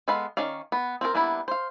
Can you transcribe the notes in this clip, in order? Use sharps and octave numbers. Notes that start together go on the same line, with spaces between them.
G#3 B3 A4 F5 B5
D#3 C#4 D5 F5
B3
C4 F4 F#4 A#4
G3 A#3 B3 D4 E4
C5 F5